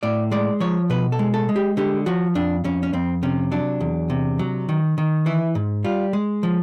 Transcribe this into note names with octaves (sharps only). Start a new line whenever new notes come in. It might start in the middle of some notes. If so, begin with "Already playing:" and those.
A2 D5
G#3 D5
F3 C#5
B2 B4
A4
G#3
A4
G#3
G4
D3 G4
F3 F#4
F2 D4
F2 C#4
C#4
F2 C4
C3 C#4
F#3 D4
E2
C3
F#3
D#3
D#3
E3 E4
G#2
G3 F4
G#3
F3